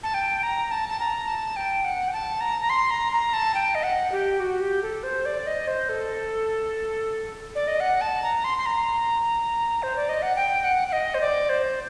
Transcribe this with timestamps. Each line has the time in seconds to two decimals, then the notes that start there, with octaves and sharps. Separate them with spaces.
0.03 A5
0.14 G5
0.43 A#5
0.71 A5
0.89 A5
0.99 A#5
1.28 A5
1.56 G5
1.84 F#5
2.08 G5
2.13 A5
2.41 A#5
2.61 A#5
2.70 C6
2.91 A#5
3.12 A#5
3.33 A5
3.54 G5
3.75 D#5
3.83 F#5
4.12 G4
4.40 F#4
4.61 G4
4.82 A4
5.03 C5
5.26 D5
5.46 D#5
5.68 C5
5.89 A4
7.55 D5
7.68 D#5
7.80 F#5
8.01 A5
8.23 A#5
8.44 C6
8.58 C6
8.66 A#5
9.83 C5
9.96 D5
10.09 D#5
10.22 F#5
10.36 G5
10.64 F#5
10.88 F#5
10.93 D#5
11.14 C5
11.21 D5
11.49 C5